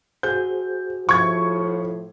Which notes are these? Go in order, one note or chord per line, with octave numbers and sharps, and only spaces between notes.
F#4 G#4 C5 G6
A2 F3 C#6 G#6